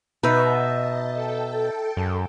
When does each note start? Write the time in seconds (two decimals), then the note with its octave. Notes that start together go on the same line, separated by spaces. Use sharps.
0.23 B2 D#4 B4 D#5 E5 A5
1.13 A4 G5 A5
1.97 F#2